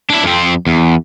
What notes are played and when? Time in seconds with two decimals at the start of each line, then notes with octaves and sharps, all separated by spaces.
0.10 D4 E4
0.24 F2 C4
0.67 E2